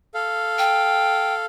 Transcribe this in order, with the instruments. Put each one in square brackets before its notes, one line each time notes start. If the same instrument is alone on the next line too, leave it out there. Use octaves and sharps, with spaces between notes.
[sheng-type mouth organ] A4 F5
[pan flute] G5